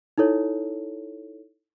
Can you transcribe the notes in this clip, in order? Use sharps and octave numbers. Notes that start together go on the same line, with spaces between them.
D#4 E4 A4 C#5